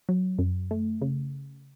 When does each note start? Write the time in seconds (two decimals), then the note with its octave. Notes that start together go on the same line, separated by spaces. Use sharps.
0.09 F#3
0.39 F#2
0.71 A3
1.02 C#3